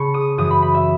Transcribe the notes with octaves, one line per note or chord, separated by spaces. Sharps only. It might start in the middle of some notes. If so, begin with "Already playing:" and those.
Already playing: C#3 A5 B5 C#6
D#6
F#2 E3 D#6
B5
B5
E5